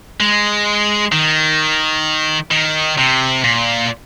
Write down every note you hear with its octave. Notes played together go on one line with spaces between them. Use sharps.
G#3
D#3
D#3
C3
A#2